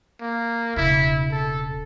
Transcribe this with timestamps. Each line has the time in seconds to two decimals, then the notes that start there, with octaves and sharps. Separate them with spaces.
0.20 A#3
0.77 E1 C#3 E4
1.32 A4